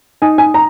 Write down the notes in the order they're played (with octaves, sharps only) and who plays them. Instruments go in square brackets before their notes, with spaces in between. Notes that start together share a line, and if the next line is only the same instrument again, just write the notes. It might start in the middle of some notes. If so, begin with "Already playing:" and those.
[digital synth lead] D#4 [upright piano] G#5
[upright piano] G#5
A#5